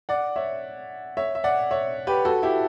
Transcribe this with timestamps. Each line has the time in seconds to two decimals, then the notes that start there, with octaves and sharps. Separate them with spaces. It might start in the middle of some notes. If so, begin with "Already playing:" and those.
0.09 D5 F#5
0.36 C#5 E5
1.17 C#5 E5
1.35 E5
1.44 D5 F#5
1.71 C#5 E5
2.07 G4 B4
2.25 F#4 A4
2.43 E4 G4